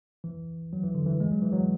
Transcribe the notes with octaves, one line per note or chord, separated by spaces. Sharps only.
E3
F#3
E3
D3
E3
G#3
F#3
E3
F#3